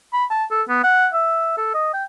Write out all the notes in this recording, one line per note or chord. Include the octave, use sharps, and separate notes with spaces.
B5
A5
A4
B3
F#5
E5
A4
D#5
G5